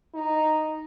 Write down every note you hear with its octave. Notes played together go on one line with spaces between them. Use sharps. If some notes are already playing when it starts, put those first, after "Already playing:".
D#4